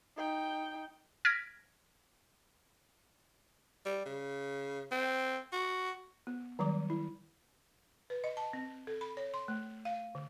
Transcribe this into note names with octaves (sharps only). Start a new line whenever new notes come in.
D#4 G5
F6 G#6 A#6 B6 D7
G3
C#3
C4
F#4
B3
D#3 F#3 G3 D6
E4
B4
D#5
A5
C4
A4
B5
C#5
C6
A3
F5
D3